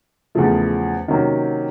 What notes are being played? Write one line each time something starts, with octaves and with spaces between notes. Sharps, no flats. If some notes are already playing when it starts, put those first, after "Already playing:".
E2 C#3 F3 A3
C3 D#3 F#3 A#3 C#4